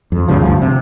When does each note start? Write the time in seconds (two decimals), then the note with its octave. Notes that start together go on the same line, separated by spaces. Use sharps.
0.12 F2
0.28 C2 G2 C#3 F3
0.41 D2 G2 F3
0.62 C3